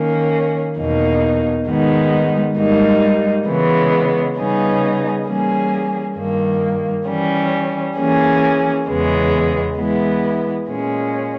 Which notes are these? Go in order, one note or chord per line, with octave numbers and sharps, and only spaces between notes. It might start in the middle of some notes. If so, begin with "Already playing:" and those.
Already playing: D#3 A#3 C#4
E2 B2 A#3 D#4
G#2 D#3 G#3 B3 D#4
G#2 G3 A#3 D#4
C#3 E3 G#3 B3
C#3 G3 B3 D#4 G#4
E3 G3 A#3 C#4 G#4
G2 D#3 A#3
E3 G3 C#4
E3 A#3 C#4 G#4
E2 C#3 E3 G#3 B3
E3 G#3 B3 E4
A#2 G#3 C#4